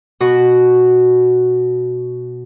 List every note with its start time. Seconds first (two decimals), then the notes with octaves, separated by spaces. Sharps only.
0.20 B2 F#4 B4